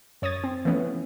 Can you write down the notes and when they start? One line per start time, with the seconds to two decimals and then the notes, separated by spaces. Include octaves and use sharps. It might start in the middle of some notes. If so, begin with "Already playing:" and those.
0.22 F#2 C#5 D#6 G#6 A6
0.44 C4
0.65 E3 F3 A3 B3 C#4